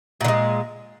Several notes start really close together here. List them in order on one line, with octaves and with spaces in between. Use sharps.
A#2 D3 G#3